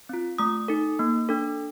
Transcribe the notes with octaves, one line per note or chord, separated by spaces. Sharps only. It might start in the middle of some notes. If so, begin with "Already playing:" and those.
C4 F4
A3 D#6
D#4 A4
A#3
D4 A4